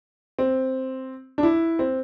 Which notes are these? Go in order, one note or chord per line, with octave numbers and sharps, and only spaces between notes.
C4
D4
E4
C4